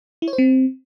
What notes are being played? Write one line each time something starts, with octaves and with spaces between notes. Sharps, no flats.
E4
C#5
C5
C4